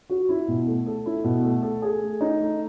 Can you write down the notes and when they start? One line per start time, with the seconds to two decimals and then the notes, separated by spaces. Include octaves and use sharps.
0.09 F#4
0.29 E4
0.48 B2
0.66 A3
0.86 A4
1.06 E4
1.24 B2
1.43 A3
1.63 A4
1.82 G#4
2.02 A3
2.21 D#4
2.40 A3